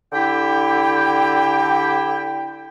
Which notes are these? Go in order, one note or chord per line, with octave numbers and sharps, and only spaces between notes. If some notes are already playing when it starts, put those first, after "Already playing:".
D3 E4 G4 G5